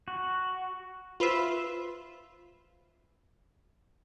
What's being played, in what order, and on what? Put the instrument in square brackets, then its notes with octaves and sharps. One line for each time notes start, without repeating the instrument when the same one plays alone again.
[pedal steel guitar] F#4
[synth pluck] F4 B4 C5 E5